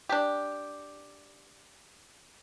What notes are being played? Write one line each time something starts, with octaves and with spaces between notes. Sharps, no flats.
D4 G4